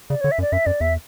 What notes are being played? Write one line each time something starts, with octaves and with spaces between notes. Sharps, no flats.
C#3 D5
D3 C#5
E5
F#2
D5
F#2 E5
F#2 D5
E2 E5